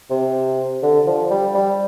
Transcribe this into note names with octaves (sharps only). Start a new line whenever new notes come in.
C3
D3
F3
G3
G3